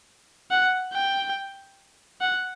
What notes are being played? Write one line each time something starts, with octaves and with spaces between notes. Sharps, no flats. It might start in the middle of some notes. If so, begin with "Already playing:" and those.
F#5
G5
F#5